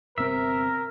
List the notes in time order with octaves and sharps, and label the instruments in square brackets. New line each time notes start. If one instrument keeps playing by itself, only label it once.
[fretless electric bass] G1 C3 C4 [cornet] A#4 [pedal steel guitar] E5